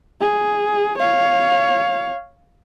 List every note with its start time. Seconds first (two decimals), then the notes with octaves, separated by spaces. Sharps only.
0.21 G#4
0.99 C#5 F5